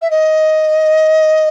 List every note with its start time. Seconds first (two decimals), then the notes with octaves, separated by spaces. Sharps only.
0.01 E5
0.10 D#5